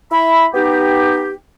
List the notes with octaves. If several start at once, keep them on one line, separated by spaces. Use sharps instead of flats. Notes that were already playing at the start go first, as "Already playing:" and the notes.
E4 E5 B5
B3 D#4 G4